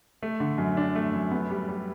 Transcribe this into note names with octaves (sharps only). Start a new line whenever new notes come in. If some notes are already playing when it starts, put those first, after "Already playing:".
A3
D3
F#2
D4
A3
F#2
B3
G3
G3